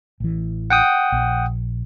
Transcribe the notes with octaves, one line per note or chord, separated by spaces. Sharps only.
A1 E3
F#5 G5 D#6
A#1